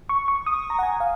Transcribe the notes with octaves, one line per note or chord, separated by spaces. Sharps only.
C#6
C#6
D#6
A#5
F#5
G#5
F5